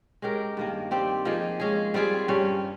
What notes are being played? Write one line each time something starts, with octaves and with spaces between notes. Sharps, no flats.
G#3 C#4 G4 A#4
G2 D#3 A#3
G3 C4 G4
F3 A#3 D#4 G#4
G#3 C#4 G#4
G3 C4 F4 G#4
G2 G3 C#4